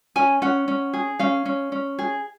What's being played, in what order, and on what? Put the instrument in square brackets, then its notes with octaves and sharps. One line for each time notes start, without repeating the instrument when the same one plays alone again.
[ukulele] C#4 G#5
C#4 F#5
C#4
G#4
C#4 F5
C#4
C#4
G#4